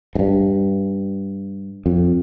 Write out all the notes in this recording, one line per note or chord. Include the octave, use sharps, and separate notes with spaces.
G#2
G2
F2